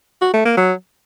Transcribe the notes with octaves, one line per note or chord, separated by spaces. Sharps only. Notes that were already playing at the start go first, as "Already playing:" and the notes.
F#4
A3
A#3
F#3